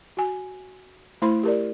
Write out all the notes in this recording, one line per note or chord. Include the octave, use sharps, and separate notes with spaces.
F#4 G#5
A3 E4 C5 B5 C6
G4 A#4 D5